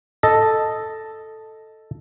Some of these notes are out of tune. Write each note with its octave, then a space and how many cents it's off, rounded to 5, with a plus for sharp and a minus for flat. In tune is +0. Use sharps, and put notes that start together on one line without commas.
A4 +0 D#5 +0